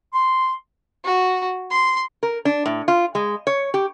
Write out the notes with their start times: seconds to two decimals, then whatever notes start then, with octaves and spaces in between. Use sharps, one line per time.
0.13 C6
1.04 F#4
1.71 C6
2.23 A#4
2.45 D4
2.66 A2
2.88 F4
3.15 G#3
3.47 C#5
3.74 G4